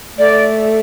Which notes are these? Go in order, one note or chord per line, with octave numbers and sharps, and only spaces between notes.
A3 D5